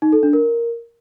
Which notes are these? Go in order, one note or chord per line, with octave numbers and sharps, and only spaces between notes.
D#4
A4
D4
A#4